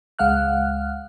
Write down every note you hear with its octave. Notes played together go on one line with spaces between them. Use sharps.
C#2 G#3 F5 F#5 F6 F#6